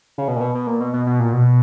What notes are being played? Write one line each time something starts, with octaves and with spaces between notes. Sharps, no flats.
C#3
B2
A#2
B2
B2
A#2
B2
B2
B2
A#2
B2